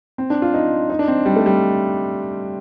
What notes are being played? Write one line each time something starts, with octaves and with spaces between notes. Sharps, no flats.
C4
D4
F4
D#4
D#4
D4
C4
G3
A3
G3